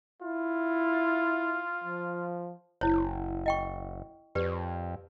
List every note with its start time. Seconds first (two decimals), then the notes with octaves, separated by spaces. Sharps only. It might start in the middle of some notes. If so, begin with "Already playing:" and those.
0.22 E4 F4
1.84 F3
2.81 F#1 E4 C5 C#5
3.46 D#5 G5 C#6
4.35 F2 G4 B4 D5